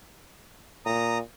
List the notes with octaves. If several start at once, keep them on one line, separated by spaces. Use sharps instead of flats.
A#2 A#5 D#6